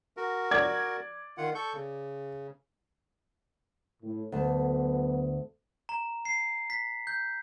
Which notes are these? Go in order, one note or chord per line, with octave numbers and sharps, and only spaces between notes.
F#4 A#4
D5 G#6
D#3 F4 F#5
A4 C#6 G6
C#3
A2
D2 F#3 B3 A5
A#5
C7
B6
G6